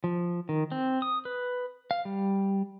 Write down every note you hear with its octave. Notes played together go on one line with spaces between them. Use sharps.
F3
D#3
C4
D#6
B4
F5
G3